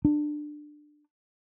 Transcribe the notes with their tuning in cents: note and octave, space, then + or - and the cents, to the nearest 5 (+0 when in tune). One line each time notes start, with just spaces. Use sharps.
D4 +20